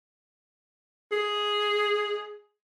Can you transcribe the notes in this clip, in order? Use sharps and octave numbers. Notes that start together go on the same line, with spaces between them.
G#4